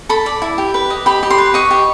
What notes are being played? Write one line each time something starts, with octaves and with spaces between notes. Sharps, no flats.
A4 B5
D5
E4
G4
B4
D#5
G4 B5
G4
C6
B4
D#5 C#6
G4